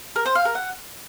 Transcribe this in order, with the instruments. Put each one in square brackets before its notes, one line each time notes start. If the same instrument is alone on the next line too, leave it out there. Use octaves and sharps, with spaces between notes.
[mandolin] A#4
C5
F5
A#4
F#5